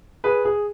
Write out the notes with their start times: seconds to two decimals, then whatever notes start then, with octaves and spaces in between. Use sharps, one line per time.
0.24 G#4 B4
0.45 G#4